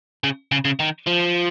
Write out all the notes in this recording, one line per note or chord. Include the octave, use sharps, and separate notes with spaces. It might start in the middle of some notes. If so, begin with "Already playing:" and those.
C#3
C#3
C#3
D#3
F3